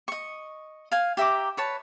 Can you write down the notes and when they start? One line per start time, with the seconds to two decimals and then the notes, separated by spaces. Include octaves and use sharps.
0.08 D#5 C#6
0.92 F5 G#5
1.17 G4 E5 A#5 D6
1.57 B4 C#5 A5